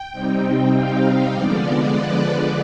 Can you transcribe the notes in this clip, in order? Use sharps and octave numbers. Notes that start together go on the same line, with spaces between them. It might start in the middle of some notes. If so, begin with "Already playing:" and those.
Already playing: G5
C3 G3 C4 D#4
F5
D3 F3 G#3 B3 D5
B4